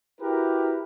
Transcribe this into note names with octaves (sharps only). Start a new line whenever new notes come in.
E4 F#4 G4 A#4 B4